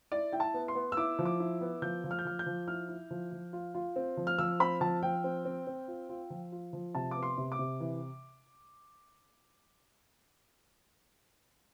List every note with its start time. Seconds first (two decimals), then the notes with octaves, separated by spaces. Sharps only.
0.12 E4 D5
0.32 E4 G5
0.40 A5
0.54 B3
0.68 C6
0.75 B3
0.92 E6
0.97 E4 D6
1.19 F3
1.25 D6
1.40 E4
1.61 B3
1.82 F3 G6
2.04 F3
2.11 F6
2.19 G6
2.25 F3 F6
2.39 G6
2.46 F3
2.68 E4 F6
2.89 E4
3.11 F3
3.32 F3
3.53 F4
3.75 F4
3.96 C4
4.17 F3
4.27 F6
4.39 F3 E6
4.60 C4 B5
4.81 F3 A5
5.03 F3 G5
5.24 C4
5.45 C4
5.67 C4
5.88 F4
6.09 F4
6.30 F3
6.52 F4
6.73 F3
6.95 C3 A5
7.11 B3 D6
7.23 C6
7.38 C3
7.52 D6
7.59 C3
7.80 E3